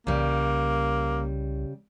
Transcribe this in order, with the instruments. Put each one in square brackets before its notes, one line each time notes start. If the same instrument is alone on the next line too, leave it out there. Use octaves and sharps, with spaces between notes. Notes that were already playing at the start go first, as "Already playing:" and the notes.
[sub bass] C2 [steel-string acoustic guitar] C#3 G3 [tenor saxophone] A#3